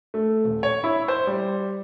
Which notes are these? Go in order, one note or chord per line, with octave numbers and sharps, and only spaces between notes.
A3
D#1
C#5
E4
C5
G3